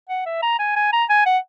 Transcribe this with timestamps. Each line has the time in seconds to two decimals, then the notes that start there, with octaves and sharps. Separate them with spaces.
0.09 F#5
0.26 E5
0.42 A#5
0.59 G#5
0.76 G#5
0.92 A#5
1.09 G#5
1.26 F#5